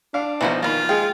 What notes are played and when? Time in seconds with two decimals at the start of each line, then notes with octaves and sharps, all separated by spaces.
0.14 D4 F5
0.41 A#1 B2 E3 D#4 C5
0.63 D#3 A#3 F4 D5 B5
0.89 G#3 G#4 F5 G5